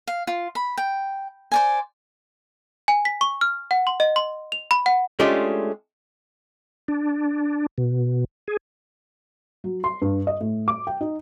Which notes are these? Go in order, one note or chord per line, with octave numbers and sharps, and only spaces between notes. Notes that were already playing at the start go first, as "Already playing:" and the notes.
F5
F4
B5
G5
C5 D5 G#5
G#5
B6
C#6
F6
F#5
C6
D#5
C6
F7
B5
F#5
G#3 A3 C#4 D4 F4 G4
D4
B2
G#4
F#3
C6
G2
D#5
A2
D6
G5
D#4